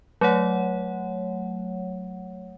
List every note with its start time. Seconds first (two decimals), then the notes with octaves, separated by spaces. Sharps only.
0.21 F#3 A3 C#5 F#5